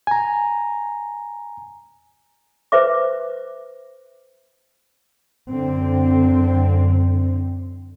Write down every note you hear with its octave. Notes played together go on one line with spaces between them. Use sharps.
G#5 A#5
B4 C5 E5 D6
F#2 D3 C4